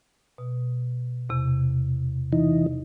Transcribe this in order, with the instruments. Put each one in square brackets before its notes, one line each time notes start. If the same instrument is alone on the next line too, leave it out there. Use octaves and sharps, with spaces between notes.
[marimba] B2
E2 C3
[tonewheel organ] E3 D#4